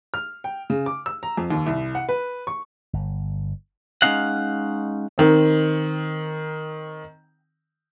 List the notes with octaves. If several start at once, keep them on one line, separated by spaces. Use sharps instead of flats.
F6
G5
C#3
D6
E6
A#5
F2
D#2
C2
F#5
B4
C#6
G1
G#3 A#3 C#4 D#4 F5 F#5
D#3 C4